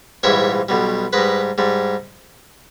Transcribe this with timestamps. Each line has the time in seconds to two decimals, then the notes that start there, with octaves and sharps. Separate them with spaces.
0.23 A#1 G#2 E3 G3 C#5 E5
0.69 B1 B2 G3
1.13 G#2 G3 B4 D#5
1.58 G#2 G3